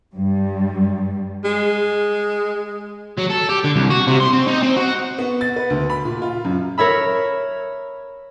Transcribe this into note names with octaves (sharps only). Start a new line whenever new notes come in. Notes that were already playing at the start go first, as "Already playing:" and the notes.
G2 G3
G#3
F#3
A4
G4
D3
C2
F#4
C3
C6
C4
D#4
C4
F#4
B3
A6
B4
D2
B5
A#2
F4
F#2
A#4 C#5 E5 B5